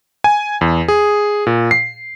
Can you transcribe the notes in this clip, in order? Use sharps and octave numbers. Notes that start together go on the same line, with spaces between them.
G#5
E2
G#4
A#2
C7